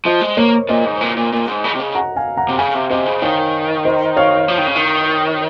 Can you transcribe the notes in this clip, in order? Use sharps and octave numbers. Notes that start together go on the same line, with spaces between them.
F3 C5 D#5
G#3
A#3 A#4 C#5
A#2 C5 D#5
G#2
A#2
A#2
A#2
G#2
C#3
C3
C#3
F#5 A#5
F5 G#5
F#5 A#5
C3
C#3 F5 G#5
C3
C3 C5 D#5
C#3
D#3 C#5 F5
C5 D#5
C#5 F5
F3
D#3
C#3
D#3